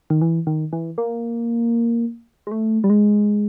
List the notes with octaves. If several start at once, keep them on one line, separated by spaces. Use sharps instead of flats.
D#3
E3
D#3
E3
A#3
G#3
A3
G3
G#3